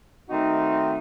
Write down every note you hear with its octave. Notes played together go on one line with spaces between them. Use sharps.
D#3 A3 C4 D#4 F#4